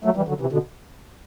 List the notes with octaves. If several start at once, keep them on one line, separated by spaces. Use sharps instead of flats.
F#3 A3
E3 G3
D3 F#3
C3 E3
B2 D3